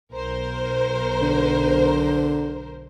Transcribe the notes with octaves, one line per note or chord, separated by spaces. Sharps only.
B1 A#4 C5
D3